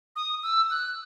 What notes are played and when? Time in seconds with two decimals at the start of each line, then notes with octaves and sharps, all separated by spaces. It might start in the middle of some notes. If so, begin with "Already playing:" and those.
0.16 D#6
0.43 E6
0.71 F#6